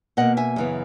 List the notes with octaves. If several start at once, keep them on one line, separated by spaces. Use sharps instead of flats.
B2 A#3 D#5 F#5
E5 G#5
F#2 C#3 E3 B3